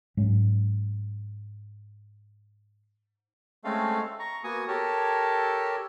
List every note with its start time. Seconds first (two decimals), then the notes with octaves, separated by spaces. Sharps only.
0.17 G#2 F#3 C#4
3.64 G#3 A3 C4 C#4 A4 F5
4.19 A#5 C#6
4.44 A#3 B3 F#4 G#5 C#6 D#6
4.68 G4 A4 A#4 C#5 A5